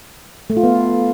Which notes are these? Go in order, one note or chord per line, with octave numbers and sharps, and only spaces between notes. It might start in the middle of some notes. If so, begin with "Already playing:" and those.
A3
F4
B3